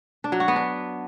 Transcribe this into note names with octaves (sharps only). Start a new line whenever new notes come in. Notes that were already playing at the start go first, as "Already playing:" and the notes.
D4
F#3
F#4
B3
D4